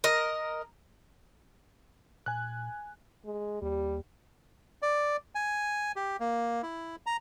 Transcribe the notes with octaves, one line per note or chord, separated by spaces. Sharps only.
A#4 D#5
A#2 G#5 F#6
G#3
D#2 G3
D5
G#5
G4
A#3
E4
A#5